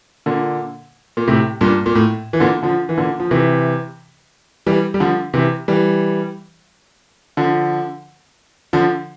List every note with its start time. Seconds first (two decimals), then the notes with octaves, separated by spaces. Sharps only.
0.26 A#2 D3
1.17 A#2
1.28 A2 C3
1.61 G2 A#2
1.86 A#2
1.95 A2
2.33 E3
2.40 A#2 D3
2.63 D3 F3
2.89 E3
2.98 A#2 D3
3.20 F3
3.31 C3 E3
4.67 E3 G3
4.94 G3
5.00 D3 F3
5.34 C3 E3
5.68 E3 G3
7.37 D3 F3
8.73 D3 F3